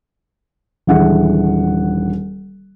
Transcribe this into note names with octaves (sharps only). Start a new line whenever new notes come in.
D#1 D3 E3 G#3 F#5